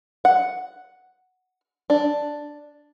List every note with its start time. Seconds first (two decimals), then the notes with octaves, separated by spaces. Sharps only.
0.25 F#5
1.90 D4